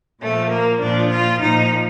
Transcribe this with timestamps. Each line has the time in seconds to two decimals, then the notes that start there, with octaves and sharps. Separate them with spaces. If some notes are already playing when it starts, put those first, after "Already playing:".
0.22 A#2 F3 A3
0.51 A#3
0.81 A#2 F3 D4
1.11 F4
1.41 A#2 F3 D#4